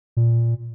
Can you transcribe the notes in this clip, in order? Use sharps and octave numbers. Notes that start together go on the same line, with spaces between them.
A#2